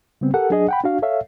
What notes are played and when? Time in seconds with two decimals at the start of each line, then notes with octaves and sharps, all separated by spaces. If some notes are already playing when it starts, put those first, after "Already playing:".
0.21 C#3 G3 B3 C4
0.34 G4 A4 A#4 F#5
0.50 F#3 D4 G#4 D#5
0.68 F#5 G5 B5
0.84 D4 F#4 F5
1.02 A4 C#5 E5 F5